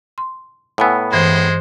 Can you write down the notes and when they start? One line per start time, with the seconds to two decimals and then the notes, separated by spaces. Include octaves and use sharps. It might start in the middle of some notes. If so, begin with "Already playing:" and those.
0.18 C6
0.78 A2 B3 F#5 G#5 E6
1.12 G2 E3 G#3 C5